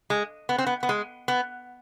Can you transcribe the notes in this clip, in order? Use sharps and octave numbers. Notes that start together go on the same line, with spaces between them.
G#3
B3
C4
B3
B3
G#3
B3